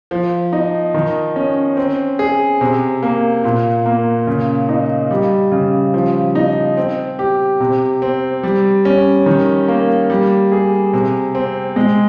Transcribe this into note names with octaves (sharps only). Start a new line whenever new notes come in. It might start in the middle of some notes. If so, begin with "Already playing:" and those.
F3
D#4
D#3
C#4
C4
G#4
C3
A#3
A#2
A#3
C#3
D#4
G3
C#3
F3
D#4
C4
G4
C3
C4
G3
C#4
D#3
A#3
G3
G#4
C3
C4
G#3